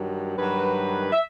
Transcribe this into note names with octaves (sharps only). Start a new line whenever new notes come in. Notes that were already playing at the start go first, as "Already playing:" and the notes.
Already playing: G2 D#3 F#3
G2 D#3 F#3 B4
E5